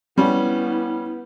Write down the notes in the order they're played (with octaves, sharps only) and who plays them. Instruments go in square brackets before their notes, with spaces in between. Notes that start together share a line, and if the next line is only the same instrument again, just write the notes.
[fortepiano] G3 C#4 [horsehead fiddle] B3 E4